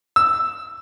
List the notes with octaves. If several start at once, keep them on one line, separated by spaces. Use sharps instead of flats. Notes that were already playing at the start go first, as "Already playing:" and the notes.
E6